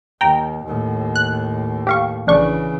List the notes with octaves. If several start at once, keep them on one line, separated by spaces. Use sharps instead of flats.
D#2 G5 A#5
D#2 A2
F#6
G4 F5 C#6
A#1 C#3 E3 D4 C#6